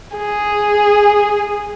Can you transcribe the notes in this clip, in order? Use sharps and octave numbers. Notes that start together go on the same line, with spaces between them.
G#4